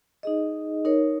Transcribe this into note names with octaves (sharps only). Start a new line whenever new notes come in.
D#4 G#4 D#5
D#4 A#4 C#5